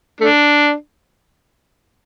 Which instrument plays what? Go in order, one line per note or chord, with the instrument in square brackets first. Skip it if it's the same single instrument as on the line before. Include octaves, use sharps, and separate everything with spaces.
[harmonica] A3 D4